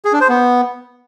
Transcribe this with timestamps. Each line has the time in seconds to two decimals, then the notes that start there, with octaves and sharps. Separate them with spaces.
0.05 G#4
0.13 D4
0.21 C5
0.29 B3